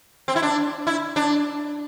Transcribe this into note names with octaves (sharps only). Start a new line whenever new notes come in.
C4
E4
D4
E4
D4